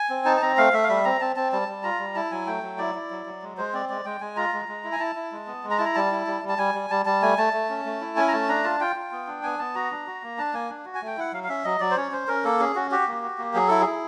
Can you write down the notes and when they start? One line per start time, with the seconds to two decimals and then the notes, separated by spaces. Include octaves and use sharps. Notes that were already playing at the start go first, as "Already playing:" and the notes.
Already playing: G#5
0.10 C4
0.25 D#4 A5
0.37 A5
0.42 C4 A#5
0.58 A3 F5
0.73 A3 E5
0.84 F5
0.88 G3 E5
1.05 C4 A#5
1.21 C4 A5
1.36 C4 A5
1.52 G3 A5
1.68 G3
1.83 F4 A#5
1.99 G3
2.15 E4 A5
2.31 F#3 G#5
2.47 A3 G5
2.63 F#3
2.78 E4 D5
2.95 E4
3.10 F#3
3.26 F#3
3.42 G#3
3.57 G#3 C5
3.73 C4 D5
3.89 G#3 D5
4.05 G#3 G5
4.21 G#3 G#5
4.36 F4 A#5
4.53 G#3
4.68 G#3
4.84 E4
4.92 G#5
5.00 E4 A5
5.15 E4
5.32 G#3
5.47 B3
5.64 G#3
5.70 A#5
5.78 E4 A5
5.85 A#5
5.95 G3 A5
6.12 E4
6.27 G3
6.42 G3
6.49 A5
6.58 G3 G#5
6.74 G3
6.90 G3 A5
7.06 G3 A5
7.22 A3 G#5
7.38 A3 A5
7.53 A3
7.69 C#4
7.85 A3
8.01 E4
8.16 C#4 G#5
8.28 A#5
8.32 A3 A5
8.49 D4 A#5
8.64 F4 A5
8.80 F4 G5
8.96 F4
9.12 B3
9.27 D4
9.43 B3 G#5
9.59 B3 A5
9.75 F#4 A#5
9.91 D4
10.07 F#4
10.23 A#3
10.38 D4 A5
10.53 A#3 G#5
10.69 D4
10.85 F#4
10.95 G#5
11.02 A3 G5
11.17 E4 F#5
11.33 F#3 F5
11.44 F5
11.49 C#4 E5
11.64 F#3 D#5
11.80 F#3 D5
11.91 C5
11.97 C#4 C#5
12.12 C#4 C5
12.28 C#4 A#4
12.45 A#3 A4
12.60 C#4 G#4
12.75 C#4 F#4
12.91 F#4 G4
13.07 A#3
13.23 F#4
13.38 A#3
13.54 F#3 G#4
13.68 E4 A4
13.81 G#4
13.86 E4